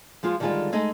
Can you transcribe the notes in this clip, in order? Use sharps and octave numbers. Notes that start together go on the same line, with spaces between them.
F3 G#3 F4
D3 D#3 G3 G#3 F4 D5
G#3 A3 D#4 D#5